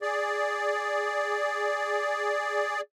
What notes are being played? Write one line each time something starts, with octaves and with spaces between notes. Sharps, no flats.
G#4 D5